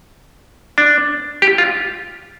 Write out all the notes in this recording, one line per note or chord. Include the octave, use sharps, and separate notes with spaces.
D4
G4
F4